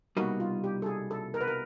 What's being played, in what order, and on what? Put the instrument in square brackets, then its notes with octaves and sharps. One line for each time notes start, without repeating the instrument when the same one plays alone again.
[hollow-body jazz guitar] C2 B2 G3 A#3 D#4 [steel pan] F#4
[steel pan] F4
G4
A4
G#4
A4
A#4
B4
A#4